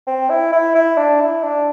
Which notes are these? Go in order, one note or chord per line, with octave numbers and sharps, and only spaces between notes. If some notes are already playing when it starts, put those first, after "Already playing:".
C4
E4
E4
E4
D4
E4
D4